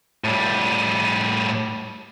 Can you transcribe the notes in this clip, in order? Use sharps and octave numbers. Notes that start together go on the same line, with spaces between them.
A2 G3